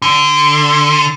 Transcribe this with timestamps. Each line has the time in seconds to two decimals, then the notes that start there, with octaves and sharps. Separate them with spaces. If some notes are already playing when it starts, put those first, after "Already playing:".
0.02 D3